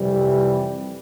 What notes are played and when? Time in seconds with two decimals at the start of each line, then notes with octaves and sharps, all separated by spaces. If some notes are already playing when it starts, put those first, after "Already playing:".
Already playing: F2 C3 E3 G3